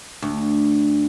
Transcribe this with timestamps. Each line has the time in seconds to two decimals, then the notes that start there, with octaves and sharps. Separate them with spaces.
0.22 D2